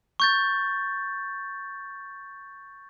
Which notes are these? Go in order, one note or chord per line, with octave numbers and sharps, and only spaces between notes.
C#6 G6 A6